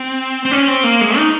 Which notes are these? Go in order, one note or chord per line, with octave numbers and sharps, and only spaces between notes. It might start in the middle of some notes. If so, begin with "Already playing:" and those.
Already playing: C4
C4
C#4
C4
A#3
G#3
D#4